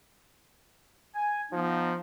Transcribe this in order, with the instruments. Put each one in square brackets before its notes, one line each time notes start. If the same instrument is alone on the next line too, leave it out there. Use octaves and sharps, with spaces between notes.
[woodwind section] G#5
[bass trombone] F3 [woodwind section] B3 D#4